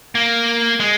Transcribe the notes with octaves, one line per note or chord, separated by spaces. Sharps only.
A#3
G#3